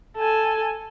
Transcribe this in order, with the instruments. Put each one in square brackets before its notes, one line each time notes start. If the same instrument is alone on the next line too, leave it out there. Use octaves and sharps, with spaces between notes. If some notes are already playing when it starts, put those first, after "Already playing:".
[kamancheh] A4 G#5